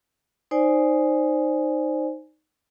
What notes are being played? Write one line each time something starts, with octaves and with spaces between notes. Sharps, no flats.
D#4 C5 D5 G#5